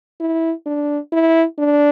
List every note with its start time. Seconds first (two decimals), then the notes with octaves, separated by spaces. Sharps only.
0.20 E4
0.66 D4
1.12 E4
1.59 D4